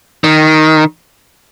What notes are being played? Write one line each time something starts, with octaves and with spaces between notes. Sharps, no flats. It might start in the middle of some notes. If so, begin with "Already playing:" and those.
D#3